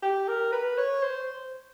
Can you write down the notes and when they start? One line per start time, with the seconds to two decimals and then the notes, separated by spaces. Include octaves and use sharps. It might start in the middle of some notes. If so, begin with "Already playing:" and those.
0.02 G4
0.28 A#4
0.52 B4
0.78 C#5
1.03 C5